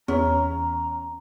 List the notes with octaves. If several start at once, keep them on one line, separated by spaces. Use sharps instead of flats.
E2 C#4 A#5